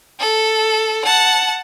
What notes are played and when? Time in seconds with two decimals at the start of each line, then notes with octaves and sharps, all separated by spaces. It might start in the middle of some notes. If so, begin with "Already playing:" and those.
0.20 A4
1.05 F#5 A5